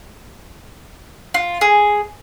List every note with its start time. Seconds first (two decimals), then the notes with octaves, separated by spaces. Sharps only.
1.34 F4
1.61 G#4